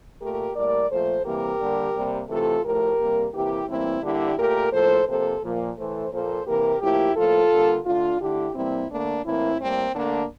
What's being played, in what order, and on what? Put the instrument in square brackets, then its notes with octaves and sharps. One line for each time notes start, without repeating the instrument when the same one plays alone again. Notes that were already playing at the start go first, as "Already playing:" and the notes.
[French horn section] A#2 A3 G4 A#4
A2 G3 A#3 A#4 D5
A#2 F3 A3 A4 C5
C3 E3 G3 A#3 G4 A#4
D3 G3 A#3
C3 G3 A#3
C3 E3 A3 F4 A4
A2 F3 A3 G4 A#4
C3 G3 A#3
C3 E3 A#3 E4 G4
A2 E3 G3 A#3 C4 E4
D3 G3 A#3 E4 G4
A#2 A3 G4 A#4
A2 F3 A#3 A4 C5
C3 F3 A#3 A4 C5
A#2 F3 A#3
A2 E3 A3 A4 C5
A#2 F3 A#3 A4 C5
C3 E3 A#3 G4 A#4
A2 F3 A#3 E4 G4
A2 F3 A#3 F4 A4
D3 G3 A#3
D3 A3 D4 F4
D3 A3 E4 G4
C3 E3 G3 A#3 C4 E4
D3 A3 A#3 D4
A2 E3 A#3 C4 E4
A2 G3 A#3 C4
D3 A3 A#3 D4